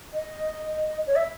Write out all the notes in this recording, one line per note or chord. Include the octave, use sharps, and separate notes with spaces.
D#5
C#5
E5